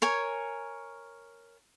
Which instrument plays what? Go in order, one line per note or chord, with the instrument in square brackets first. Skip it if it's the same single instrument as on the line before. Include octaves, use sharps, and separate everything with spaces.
[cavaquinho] A#4 C#5 G#5